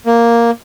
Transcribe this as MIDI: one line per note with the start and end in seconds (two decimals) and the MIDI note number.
0.06 0.51 58